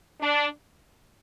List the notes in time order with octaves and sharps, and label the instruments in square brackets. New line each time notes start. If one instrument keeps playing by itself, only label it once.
[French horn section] D4